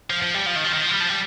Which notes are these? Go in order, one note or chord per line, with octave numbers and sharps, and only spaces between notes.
F3
F3
G3
F3
D#3
F3
D#3
F3
G3
F3
G3